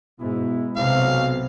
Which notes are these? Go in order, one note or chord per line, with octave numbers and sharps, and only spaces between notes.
G#2 B2 G#3 E4
B1 C3 F5